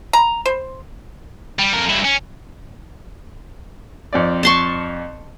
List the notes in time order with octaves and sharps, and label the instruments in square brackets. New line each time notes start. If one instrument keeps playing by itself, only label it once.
[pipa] A#5
C5
[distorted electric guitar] G3
F2 A#4
G2 E4
C#4
[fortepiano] F2 C4 D5
[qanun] A5 C6 C#6